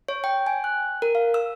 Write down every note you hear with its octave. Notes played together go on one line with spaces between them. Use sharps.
C#5
G5
G#5
F#6
A#4
F5
E6